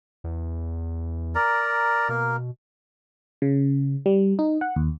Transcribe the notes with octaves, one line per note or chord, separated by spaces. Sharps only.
E2
A#4 D5 A#5
B2 A#3 A#4
C#3
G3
D#4
F#5
D#2